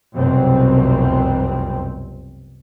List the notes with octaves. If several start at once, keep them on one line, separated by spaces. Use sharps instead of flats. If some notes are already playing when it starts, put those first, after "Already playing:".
F1 C2 F#2 B2 C4